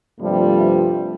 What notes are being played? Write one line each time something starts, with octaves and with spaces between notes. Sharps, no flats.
G2 C3 F3 G3 A3